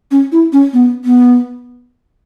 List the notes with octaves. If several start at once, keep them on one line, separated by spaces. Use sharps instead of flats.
C#4
E4
C#4
B3
B3